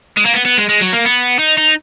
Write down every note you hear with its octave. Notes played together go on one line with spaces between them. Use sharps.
G#3
A#3
B3
B3
G#3
G#3
F#3
A#3
B3
D#4
D#4